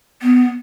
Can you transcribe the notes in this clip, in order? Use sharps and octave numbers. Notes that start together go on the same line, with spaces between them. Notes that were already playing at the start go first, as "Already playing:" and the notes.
B3